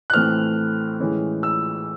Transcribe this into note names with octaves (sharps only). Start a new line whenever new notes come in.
F#6
A2 E3 A3 C4 F6
A2 E3 G#3 C#4
E6